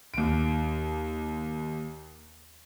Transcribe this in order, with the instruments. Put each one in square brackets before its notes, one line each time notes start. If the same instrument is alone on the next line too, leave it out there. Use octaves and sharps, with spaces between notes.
[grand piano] D#2 D7